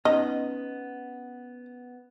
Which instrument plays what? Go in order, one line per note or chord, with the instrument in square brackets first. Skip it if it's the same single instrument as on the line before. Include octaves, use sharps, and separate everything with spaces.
[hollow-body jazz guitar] B3 C#4 D#4 [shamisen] D#5